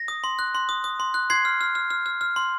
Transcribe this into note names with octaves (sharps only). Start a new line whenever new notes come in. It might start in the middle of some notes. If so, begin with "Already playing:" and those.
Already playing: A#6
D#6
C6
F#6
C6
D#6
D#6
C6
F#6
C6 G#6 C7
F6
F6
F6
F6
F6
F6
C6